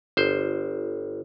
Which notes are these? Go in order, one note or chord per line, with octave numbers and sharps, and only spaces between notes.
G1 C5